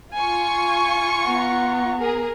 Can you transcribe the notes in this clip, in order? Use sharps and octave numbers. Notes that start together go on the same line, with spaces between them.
F4 G#5 C#6
B3 F#5 A#5
G#4 A#4